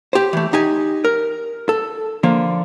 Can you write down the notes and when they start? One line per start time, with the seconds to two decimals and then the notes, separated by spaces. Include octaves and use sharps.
0.13 G4 C5
0.33 E3 A3
0.53 D#4 G4 G#5
1.05 A#4
1.69 A4
2.23 D3 F3 A#3